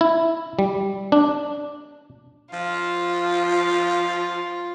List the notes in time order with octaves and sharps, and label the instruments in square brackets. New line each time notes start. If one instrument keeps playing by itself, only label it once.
[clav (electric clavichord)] E4
G3
D4
[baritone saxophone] F3 [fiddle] F4